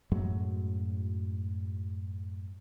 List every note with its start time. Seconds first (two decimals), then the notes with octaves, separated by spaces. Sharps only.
0.12 F#2 A2 F#3 G#3